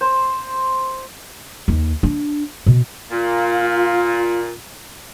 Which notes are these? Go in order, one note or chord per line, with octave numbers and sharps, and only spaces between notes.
C5
D#2
D4
B2
A#2 F4